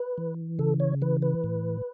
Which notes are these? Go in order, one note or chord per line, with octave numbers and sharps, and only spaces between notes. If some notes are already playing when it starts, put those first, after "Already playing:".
Already playing: B4
E3
C#3 A4
C#5
E3 B4
B4
A2